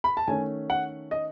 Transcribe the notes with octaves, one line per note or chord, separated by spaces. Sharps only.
B5
A5
D#3 A3 C#4 G#5
F#5
D#5